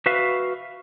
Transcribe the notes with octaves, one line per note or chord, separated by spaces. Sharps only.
F#4 B4 E5 F5